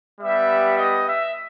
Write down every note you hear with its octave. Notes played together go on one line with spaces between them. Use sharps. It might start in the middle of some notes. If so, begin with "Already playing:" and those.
G3 B3 G4 E5
D#5
E5